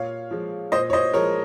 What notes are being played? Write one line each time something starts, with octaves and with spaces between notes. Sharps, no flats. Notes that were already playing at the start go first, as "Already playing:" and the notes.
Already playing: A#2 C#5 F5
F3 G#3
A#2 C5 D#5
C#5
C5 D#5
F3 G#3 A#4 C#5